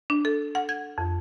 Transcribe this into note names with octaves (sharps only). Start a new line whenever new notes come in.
D4
A4
F#5
G#6
F2